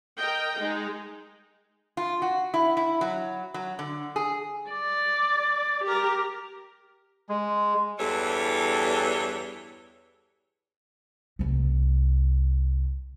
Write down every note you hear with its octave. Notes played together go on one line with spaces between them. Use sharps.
A#4 D#5 G5
G#3 D#4
F4
F#4
E4
E4
F#3
F#3
D3
G#4
D5
G4 A#4
G#3
E2 G2 E3 G3 A4 C#5
C2 A3